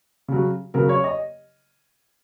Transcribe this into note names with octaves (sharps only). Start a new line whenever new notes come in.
C#3 F#3
C#3 F#3 A#4
C#5
D#5